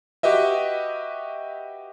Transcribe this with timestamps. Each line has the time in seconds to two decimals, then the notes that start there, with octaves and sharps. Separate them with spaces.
0.23 F#4 G4 B4 D#5 E5